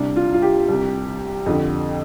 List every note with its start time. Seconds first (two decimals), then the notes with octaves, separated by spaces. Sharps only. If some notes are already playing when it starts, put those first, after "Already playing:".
Already playing: C2 C3 D4
0.16 F4
0.34 F4
0.42 G4
0.68 C2 C3
1.46 F2 D3